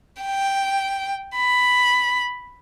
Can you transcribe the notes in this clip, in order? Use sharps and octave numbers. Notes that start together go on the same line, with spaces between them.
G5
B5